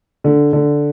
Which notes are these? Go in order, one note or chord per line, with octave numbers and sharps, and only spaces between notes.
D3
D3